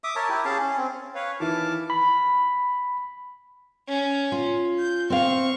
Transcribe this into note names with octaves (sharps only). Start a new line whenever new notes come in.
E5 D6 D#6
A#4 C#5 E5 A5
E4 G4
C#4 G#4 F5 A5
C#4
C4
B4 C#5 F5
D#3 E3 E4 A5 D6 F6
B5
C#4
F4
G6
C4 F5 C#6